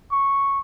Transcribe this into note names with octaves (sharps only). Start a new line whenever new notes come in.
C#6